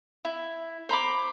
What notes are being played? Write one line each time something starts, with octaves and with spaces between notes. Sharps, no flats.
E4
C5 A#5 B5 D6